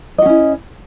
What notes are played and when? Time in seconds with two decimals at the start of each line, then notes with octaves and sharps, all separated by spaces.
0.18 D#5
0.22 F#4
0.26 C#4
0.29 E4